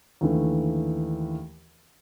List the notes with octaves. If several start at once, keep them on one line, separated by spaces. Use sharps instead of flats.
D#2 D3 E3 A3